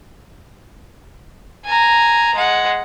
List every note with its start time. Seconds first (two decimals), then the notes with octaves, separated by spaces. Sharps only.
1.65 G#5 A#5
2.34 G#3 F#5